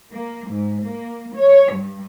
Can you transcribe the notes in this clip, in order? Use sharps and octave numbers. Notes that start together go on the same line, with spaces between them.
A#3
G#2
A#3
C#5
G2